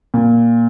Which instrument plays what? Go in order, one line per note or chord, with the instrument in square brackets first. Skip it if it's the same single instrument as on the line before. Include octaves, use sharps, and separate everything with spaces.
[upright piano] A#2